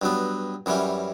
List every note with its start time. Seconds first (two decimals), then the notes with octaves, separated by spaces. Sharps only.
0.02 G2 F#3 B3
0.66 F#2 E3 G3 C#4